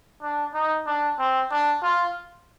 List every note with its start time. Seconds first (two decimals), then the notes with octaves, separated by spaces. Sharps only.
0.22 D4
0.54 D#4
0.87 D4
1.19 C4
1.51 D4
1.83 F4